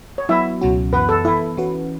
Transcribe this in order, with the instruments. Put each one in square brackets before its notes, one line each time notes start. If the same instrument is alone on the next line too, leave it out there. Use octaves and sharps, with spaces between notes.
[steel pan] C#5
[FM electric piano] F#3 B3 F#4 [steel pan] E4 E5
[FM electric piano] C#2 B2 F#3 C#4 F#4
[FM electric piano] F#2 E3 B3 F#4 [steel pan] B4
[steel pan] A4
[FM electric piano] E3 B3 A4 [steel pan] E4
[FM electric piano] E3 C#4 F#4 B4